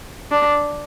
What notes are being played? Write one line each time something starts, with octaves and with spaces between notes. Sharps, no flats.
D4